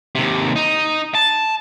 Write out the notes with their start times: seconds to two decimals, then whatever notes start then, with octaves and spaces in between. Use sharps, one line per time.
0.15 D#2 C3
0.56 D#4
1.15 A5